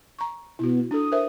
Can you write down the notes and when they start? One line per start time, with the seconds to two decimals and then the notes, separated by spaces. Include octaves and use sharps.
0.19 A#5 C#6
0.59 B2 E4 F#4
0.91 D4 A4 D#6
1.12 A#4 C5 E5